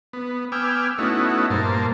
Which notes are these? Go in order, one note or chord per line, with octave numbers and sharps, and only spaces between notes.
B3
B3 G5 G#5 D6 E6 F6
A3 B3 C#4 D#4 E4 F#4
G2 A#2 A#3 C5 A5